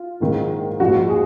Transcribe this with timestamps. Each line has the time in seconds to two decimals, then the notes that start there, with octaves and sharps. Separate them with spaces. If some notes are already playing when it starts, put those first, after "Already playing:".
Already playing: F4
0.20 A#1 G#2 D#3
0.80 A#1 G#2 F3 F#4
1.10 G#4